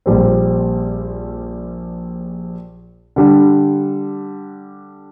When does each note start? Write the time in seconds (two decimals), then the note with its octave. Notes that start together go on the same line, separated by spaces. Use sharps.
0.06 A#1 A#2 G3 C4
3.16 D3 G3 D4